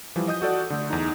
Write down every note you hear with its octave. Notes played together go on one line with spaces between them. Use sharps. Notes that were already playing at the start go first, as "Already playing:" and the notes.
E3 F3 G3
D#5 D#6 G6
F#4 A4 D5 F#5
D3 A3
E2 D#4